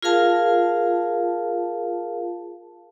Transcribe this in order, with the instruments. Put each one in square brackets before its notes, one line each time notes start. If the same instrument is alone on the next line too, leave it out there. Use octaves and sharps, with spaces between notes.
[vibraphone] F4 G#4 A#4 F5 A5